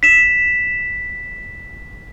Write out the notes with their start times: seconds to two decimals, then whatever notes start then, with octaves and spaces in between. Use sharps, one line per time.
0.03 B6 E7